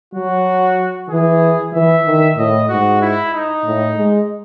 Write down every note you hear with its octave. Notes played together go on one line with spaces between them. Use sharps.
F#3 F#4
E3 G#4
E3 E5
D#3
A2 D#5
G#2 F#4
E4
D#4
A2
G#3